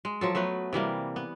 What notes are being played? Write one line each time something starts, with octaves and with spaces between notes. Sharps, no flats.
G#3
F3 F#3 A4
F#3 A3 B3 B4
C3 E3 G3 A#3
B3